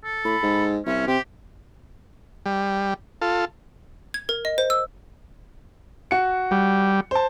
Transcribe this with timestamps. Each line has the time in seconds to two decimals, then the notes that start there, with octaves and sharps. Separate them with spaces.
0.04 A4
0.25 A2 B5
0.43 G#2
0.86 C2 C#4 E5
1.07 C3 G4 G5
2.46 G3
3.21 F4 A4
4.14 G#6
4.29 A#4
4.45 D#5
4.58 C5
4.70 E6
6.11 F#4 C#7
6.51 G3
7.11 C5 A5